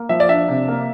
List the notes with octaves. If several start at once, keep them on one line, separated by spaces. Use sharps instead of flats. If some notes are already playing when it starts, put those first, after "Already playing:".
Already playing: A#3
F3 E5
D5
D4 E5
C3
A#3